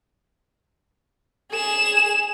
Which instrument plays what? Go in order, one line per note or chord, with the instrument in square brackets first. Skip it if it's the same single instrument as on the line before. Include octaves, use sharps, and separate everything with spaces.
[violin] G#4 E7